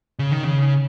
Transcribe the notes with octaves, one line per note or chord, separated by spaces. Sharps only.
C#3
D#3
C#3